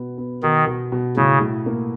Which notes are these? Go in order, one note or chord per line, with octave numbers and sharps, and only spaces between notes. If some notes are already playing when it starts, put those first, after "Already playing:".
Already playing: B2 B3
B3
B2 D#3
B2
B2
A2 C#3
A2
A#3